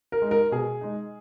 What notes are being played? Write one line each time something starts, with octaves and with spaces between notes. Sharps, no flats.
A#4
G#3 D#4
A#4
B2 G#4
G#3 D#4